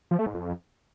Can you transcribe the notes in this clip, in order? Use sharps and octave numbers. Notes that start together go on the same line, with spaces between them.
F3
A3
G#2
F2